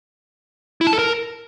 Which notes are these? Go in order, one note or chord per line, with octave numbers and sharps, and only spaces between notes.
E4
A5
A4
A#4